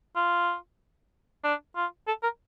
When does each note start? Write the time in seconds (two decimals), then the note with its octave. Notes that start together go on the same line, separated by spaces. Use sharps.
0.16 F4
1.44 D4
1.76 F4
2.07 A4
2.23 A#4